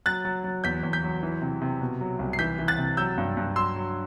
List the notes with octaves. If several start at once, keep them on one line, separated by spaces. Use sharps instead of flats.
F#3 F#6 A6
F#3
F#3
E2 G6 B6
E2
G6 B6
F#3
E3
C3
C3
B2
F#3
C2
C7
E3 G6 B6
E3
F#6 A6
C3
F#3 E6 G6
G2
G2
F#3 C6 E6
F#3